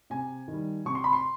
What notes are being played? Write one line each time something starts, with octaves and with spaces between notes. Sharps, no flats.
C3 G#5
D#3
G3
C3 C#6
C6
B5
C6